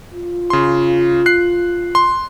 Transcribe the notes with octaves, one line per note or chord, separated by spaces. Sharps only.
F4
C#3 C6
F#6 C7
C6